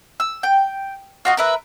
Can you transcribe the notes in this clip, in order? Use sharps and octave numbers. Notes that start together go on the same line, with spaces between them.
E6
G5
F4 F#4 D#5
A#4 B4 E5